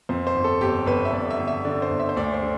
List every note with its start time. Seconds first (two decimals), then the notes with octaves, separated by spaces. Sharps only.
0.09 F2 C5
0.27 C5
0.36 G1
0.44 A4
0.61 G1 G4
0.86 G1 B4
1.05 E5
1.13 G1 D5
1.30 E5
1.39 G1
1.48 E5
1.65 D3 D5
1.82 C5
1.91 G1
1.99 E5
2.09 C5
2.16 D2 D5
2.34 C5
2.42 D3